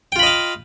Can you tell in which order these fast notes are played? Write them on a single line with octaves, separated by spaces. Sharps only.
G5 F4 B5 D#5 F5